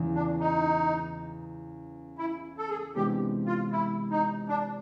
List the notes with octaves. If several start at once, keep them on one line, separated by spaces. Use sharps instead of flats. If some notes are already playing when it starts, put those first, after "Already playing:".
Already playing: E2 C#3 E3
D4
D#4
E4
A4
G#4
C3 E3 G#3 B3 D4 G4
F4
E4
D#4
D4